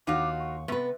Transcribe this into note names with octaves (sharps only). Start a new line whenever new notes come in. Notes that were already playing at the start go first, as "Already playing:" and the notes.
D#2 D#4 F4 F#4 F5 F#5 D6
C#6
C3 B3 B4